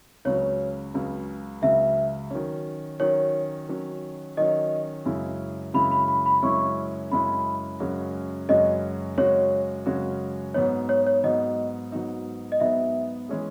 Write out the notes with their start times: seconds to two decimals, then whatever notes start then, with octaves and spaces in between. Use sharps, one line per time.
0.25 C#2 C#3 F#3 C#5
0.94 C#2 C#3 F#3
1.62 C#2 C#3 F#3 E5
2.31 D#3 F#3 C#4
3.00 D#3 F#3 C#4 C#5
3.69 D#3 F#3 C#4
4.37 D#3 F#3 C#4 D#5
5.05 F#2 C#3 G#3 C#4 E4
5.74 F#2 C#3 G#3 C#4 E4 B5
5.91 B5
6.08 B5
6.26 B5
6.42 F#2 C#3 G#3 C#4 E4 C#6
7.11 F#2 C#3 G#3 C#4 E4 B5
7.80 F#2 C#3 G#3 C#4 F#4
8.49 F#2 C#3 G#3 C#4 F#4 D#5
9.17 F#2 C#3 G#3 C#4 F#4 C#5
9.86 F#2 C#3 G#3 C#4 F#4
10.54 G#2 F#3 B3 D#4 C#5
10.89 C#5
11.06 C#5
11.24 G#2 F#3 B3 D#4 D#5
11.92 G#2 F#3 B3 D#4
12.52 D#5
12.60 G#2 F#3 B3 D#4 E5
13.29 E3 G#3 C#4 G#4